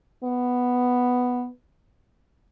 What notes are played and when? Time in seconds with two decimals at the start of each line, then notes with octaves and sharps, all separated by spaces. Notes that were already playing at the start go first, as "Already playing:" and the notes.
0.24 B3